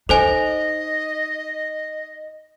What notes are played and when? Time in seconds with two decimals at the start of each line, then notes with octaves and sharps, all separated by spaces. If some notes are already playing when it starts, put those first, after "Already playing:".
0.09 D#4 A4 C5 D#5 G#5